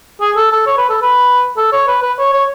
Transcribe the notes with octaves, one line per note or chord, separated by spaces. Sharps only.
G#4
A4
A4
C#5
B4
A4
B4
A4
C#5
B4
B4
C#5
C#5